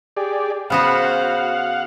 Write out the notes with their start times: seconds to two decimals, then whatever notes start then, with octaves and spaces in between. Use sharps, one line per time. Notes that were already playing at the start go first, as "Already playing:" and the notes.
0.17 G4 G#4 D5
0.70 C#3 B3 F#4 C5 F5 F#5